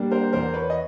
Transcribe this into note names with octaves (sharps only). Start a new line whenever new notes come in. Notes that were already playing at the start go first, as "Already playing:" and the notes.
Already playing: G3 A#3 D4
A#4 C5
E2 A#4 C5
B4 C#5
D#5